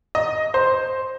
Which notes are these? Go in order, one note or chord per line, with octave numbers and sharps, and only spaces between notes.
D#5
C5